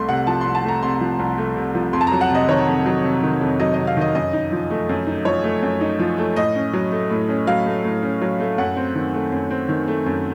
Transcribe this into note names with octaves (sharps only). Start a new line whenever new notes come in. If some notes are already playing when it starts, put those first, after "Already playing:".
Already playing: C2 A3 C6
C3 F#5
F3 A5
C6
C2
A5
A3 A#5
C3 C6
F3
C2
A3
C3
F3
F2 C6
A5
A#5
F#3
F#5
C3 D#5
D#3 C#5
F2
F#3
C3
D#3
F2
F#3 D#5
D#5
C3
F5
D#3 D#5
F#2 D#5
D#4
F3
A3
F#2
D#4
F3 C#5
A3
F#2
D#4
F3
A3
A2 D#5
C#4
F#3
A3
A2
C#4
F#3 F5
A3
A2
C#4
F#3
A3
F#2 F#5
C4
D#3
A3
F#2
C4
D#3
A3
F#2